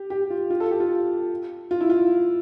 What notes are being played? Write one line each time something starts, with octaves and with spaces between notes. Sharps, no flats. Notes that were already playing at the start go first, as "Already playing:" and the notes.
Already playing: G4
G4
F4
F4
A4
G4
F4
F4
E4
F4